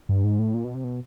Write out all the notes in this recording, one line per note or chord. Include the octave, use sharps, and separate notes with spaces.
G2
G#2
A2
A#2
B2
C3
B2